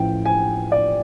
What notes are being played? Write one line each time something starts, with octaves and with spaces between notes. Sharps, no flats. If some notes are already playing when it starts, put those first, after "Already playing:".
Already playing: A1 A2 F3 G5
G#5
D5